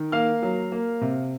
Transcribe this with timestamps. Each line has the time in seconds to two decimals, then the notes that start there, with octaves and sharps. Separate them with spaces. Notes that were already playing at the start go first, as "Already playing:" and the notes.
Already playing: D#3
0.12 A#3 F5 F6
0.43 F#3
0.72 A#3
1.01 C3